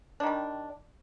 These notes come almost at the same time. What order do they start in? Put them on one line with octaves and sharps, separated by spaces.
D4 D#3 G3